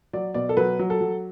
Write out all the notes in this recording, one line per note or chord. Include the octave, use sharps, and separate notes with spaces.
F#3 D5
B2 D5
A4
F#3 B4
F#3
A4
F#3